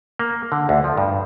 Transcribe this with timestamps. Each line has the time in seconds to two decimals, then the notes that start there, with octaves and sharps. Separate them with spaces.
0.19 A#3
0.52 D3
0.69 D2
0.84 F3
0.97 G2